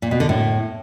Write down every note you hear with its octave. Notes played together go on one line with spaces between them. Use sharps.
A#2
B2
D3
A2